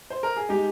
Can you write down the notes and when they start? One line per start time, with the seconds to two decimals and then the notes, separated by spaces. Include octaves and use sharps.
0.10 C5
0.23 A#4
0.37 G#4
0.49 G#3 D#4 G4